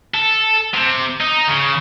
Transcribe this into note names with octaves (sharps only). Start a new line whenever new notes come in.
A4
C3
D#4
C#3